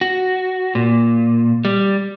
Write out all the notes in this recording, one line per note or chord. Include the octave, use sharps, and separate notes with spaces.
F#4
A#2
G3